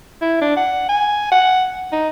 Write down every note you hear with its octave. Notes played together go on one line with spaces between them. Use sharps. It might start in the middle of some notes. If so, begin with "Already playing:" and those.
E4
D4
F#5
G#5
F#5
D#4